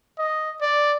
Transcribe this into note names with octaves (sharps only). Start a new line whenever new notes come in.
D#5
D5